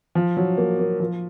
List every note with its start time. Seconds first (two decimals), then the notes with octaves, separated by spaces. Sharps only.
0.15 F3
0.37 F#3
0.58 A#3
0.79 A#3
1.00 F3